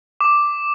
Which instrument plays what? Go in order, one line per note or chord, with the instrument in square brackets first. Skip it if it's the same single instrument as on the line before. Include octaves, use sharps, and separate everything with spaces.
[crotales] D6